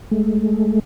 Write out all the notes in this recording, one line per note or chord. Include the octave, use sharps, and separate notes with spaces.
G#3 A3